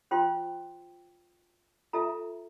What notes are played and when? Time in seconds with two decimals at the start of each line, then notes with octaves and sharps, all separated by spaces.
0.11 F4 C5 G5 C6
1.93 F4 A4 E5 A#5